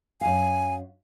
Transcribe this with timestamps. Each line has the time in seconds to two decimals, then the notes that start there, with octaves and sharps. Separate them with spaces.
0.21 F#2 F5 G#5